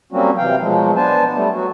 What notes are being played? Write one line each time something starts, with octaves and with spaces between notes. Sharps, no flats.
F#3 G3 A#3 C4 C#4 F#4
C3 E3 F5 G5
B2 F3 F#3 G#3
B3 D4 C5 G#5 A5
G3 A3 B3
F#3 F#4